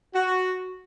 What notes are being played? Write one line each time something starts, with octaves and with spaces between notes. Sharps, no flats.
F#4